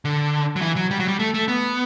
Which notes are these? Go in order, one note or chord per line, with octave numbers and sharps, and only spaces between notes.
D3
F#3
E3
F#3
G3
F#3
G3
A3
A3
B3